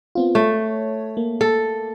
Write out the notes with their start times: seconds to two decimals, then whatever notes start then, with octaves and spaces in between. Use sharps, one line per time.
0.15 B3 C4 F4
0.35 A3 C#5
1.17 A#3
1.41 A4